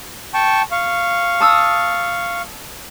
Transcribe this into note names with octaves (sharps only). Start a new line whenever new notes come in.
G5 A5 C#6
F5 C#6
A5 D#6 E6